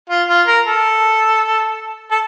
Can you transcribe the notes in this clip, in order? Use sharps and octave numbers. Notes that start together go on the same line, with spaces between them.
F4
F4
A#4
A4
A4